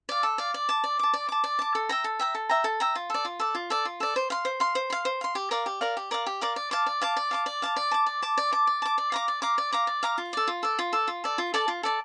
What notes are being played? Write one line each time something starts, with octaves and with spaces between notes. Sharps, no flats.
D5 F5
A4
D5 F5
D5
A5 D6
D5
A5 D6
D5
A5 D6
D5
A5 D6
A4
E5 G5 A#5
A4
E5 G5 A#5
A4
E5 G5 A#5
A4
E5 G5 A#5
F4
A4 D5
F4
A4 D5
F4
A4 D5
F4
A4 D5
C5
F5 C6
C5
F5 C6
C5
F5 C6
C5
F5 C6
G4
A#4 D5 F5
G4
A#4 D5 F5
G4
A#4 D5 F5
G4
A#4 D5 F5
D5
F5 A5 D6
D5
F5 A5 D6
D5
F5 A5 D6
D5
F5 A5 D6
D5
A5 D6
D5
A5 D6
D5
A5 D6
D5
A5 D6
D5
F5 A#5 D6
D5
F5 A#5 D6
D5
F5 A#5 D6
D5
F5 A#5 D6
F4
A4 D5
F4
A4 D5
F4
A4 D5
F4
A4 D5
F4
A4 D5 A5
F4
A4 D5 A5